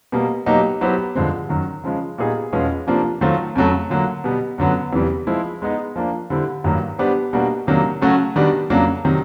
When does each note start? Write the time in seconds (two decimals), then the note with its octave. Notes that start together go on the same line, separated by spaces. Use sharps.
0.12 B2 G3 A#3
0.46 B2 F#3 A#3 D#4 G4
0.81 F#3 B3 E4 G4 C5
1.15 G2 D3 F3 G#3 C4
1.49 F#2 D#3 F#3
1.84 C#3 F3 G#3
2.18 A#2 G3 B3 D#4 G#4
2.53 E2 B2 G#3 C#4 F4
2.87 C3 F3 A#3 D4 F4
3.21 D#3 F#3 A3 C4 F4
3.55 F2 C#3 F#3 A3
3.90 D3 F#3 A#3
4.24 B2 G3 B3
4.58 F#2 D3 F#3 B3
4.93 E2 C3 E3 G3
5.27 F3 G#3 C4 E4
5.62 G#3 B3 D#4
5.96 F3 A#3 D4
6.30 D3 G3 C4 E4
6.64 G2 D#3 F#3 A#3
6.98 G3 B3 D4 G4 C5
7.33 B2 G3 A#3 D4 F#4
7.67 C3 D#3 F#3 A#3 D4
8.01 C#3 F#3 A3 C#4 F#4
8.36 D#3 G3 B3 D4 F#4
8.70 F2 C#3 F#3 A#3 D4
9.04 C3 D#3 F#3